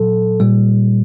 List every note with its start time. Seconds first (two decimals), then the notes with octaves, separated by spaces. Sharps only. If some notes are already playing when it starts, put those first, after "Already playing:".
Already playing: A#2 F#3 A4
0.40 A#2 G3